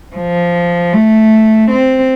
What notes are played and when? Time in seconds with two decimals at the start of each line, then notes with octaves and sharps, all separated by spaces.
0.16 F3
0.93 A3
1.71 C4